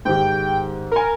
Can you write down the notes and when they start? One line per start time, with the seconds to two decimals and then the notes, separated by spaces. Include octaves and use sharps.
0.05 G#2 D#3 G4 G5
0.92 A#4 G#5 A#5